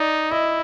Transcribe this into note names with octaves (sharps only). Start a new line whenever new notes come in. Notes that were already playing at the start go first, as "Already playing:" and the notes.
Already playing: D#4 D5
E4 D#5